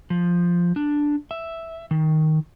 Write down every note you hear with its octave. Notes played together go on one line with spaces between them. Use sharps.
F3
D4
E5
D#3